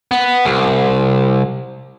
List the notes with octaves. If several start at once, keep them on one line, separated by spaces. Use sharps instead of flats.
B3
C2